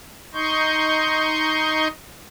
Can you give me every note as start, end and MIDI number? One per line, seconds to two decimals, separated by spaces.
0.34 1.88 63
0.34 1.88 75
0.34 1.88 84
0.34 1.88 85
0.34 1.88 91